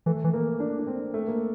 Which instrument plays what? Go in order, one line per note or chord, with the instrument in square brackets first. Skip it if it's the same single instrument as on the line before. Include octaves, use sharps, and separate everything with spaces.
[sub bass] E3 [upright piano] A3
[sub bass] E3
[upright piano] A#3
D4
D4
C4
A3
A#3